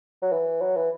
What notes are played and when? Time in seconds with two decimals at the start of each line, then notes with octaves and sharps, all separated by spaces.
0.22 F#3
0.32 E3
0.61 F#3
0.77 E3